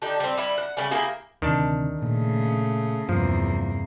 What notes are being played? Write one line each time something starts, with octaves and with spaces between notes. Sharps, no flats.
D3 D4 D#4 G4
G3 C4
G3 E4
F#5
C#3 G3
A#3 E4 G4 G#4
D2 C3 D#3 D4 A5
A#2 C#3 A3
E2 G2 C3 F3 A#3